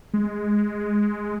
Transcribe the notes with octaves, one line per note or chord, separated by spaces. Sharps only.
G#3